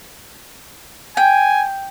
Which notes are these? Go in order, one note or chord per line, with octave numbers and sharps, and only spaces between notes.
G5 G#5